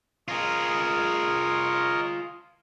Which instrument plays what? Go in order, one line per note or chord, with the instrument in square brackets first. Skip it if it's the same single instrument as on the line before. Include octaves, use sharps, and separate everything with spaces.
[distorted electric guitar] F4 G#4 [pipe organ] A#4 C#5 D#5